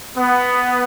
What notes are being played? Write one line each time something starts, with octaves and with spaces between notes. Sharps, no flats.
B3